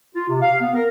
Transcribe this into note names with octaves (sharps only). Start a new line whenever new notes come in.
F4
C3
F5
B3
A#4